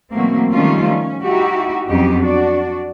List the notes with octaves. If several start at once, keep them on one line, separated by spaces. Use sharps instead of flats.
B2 E3 F#3 A3 A#3 C4
D#3 F3 G3 A3 C#4 F4
C#4
D#4 E4 F#4 G4
F2 F#3 B3 C#4 D#4 G4
D4 F#4 D5